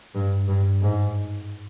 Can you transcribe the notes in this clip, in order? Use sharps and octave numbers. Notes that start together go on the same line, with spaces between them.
G2
G2
G#2